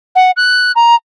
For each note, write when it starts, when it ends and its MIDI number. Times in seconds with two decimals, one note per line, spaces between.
0.15 0.31 78
0.37 0.72 90
0.76 0.95 82